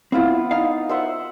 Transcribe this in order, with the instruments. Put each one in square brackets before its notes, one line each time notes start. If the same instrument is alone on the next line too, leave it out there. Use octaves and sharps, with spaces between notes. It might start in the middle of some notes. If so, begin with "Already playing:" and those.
[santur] B3 F4 [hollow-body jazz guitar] C4 E4
[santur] D#4 [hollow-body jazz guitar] F5
[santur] C5 E5 F#5